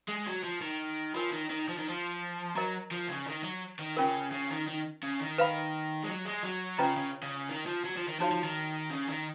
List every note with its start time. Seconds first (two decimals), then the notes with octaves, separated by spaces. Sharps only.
0.09 G#3
0.27 F#3
0.44 F3
0.62 D#3
1.14 F3 F4 A#4 C#5 G#5
1.32 D#3
1.50 D#3
1.68 F3
1.78 D#3
1.89 F3
2.56 F#3 A#4 D#5 A#5 C#6
2.91 F3
3.09 C#3
3.26 D#3
3.44 F#3
3.79 D#3
3.97 C#3 C#4 F4 A#4
4.31 C#3
4.50 D#3
4.67 D#3
5.03 C#3
5.20 D#3
5.38 B4 F5 B5
6.04 G#3
6.08 F#3
6.26 G#3
6.43 F#3
6.78 C#3 C#4 F4 B4 D#5 A#5
6.97 C#3
7.23 C#3
7.49 D#3
7.66 F3
7.85 F#3
7.97 F3
8.08 D#3
8.19 F3 D#4 F#4 C#5 F5
8.31 F3
8.44 D#3
8.90 C#3
9.08 D#3